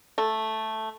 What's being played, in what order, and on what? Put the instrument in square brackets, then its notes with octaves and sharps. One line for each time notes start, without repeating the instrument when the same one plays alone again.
[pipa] A3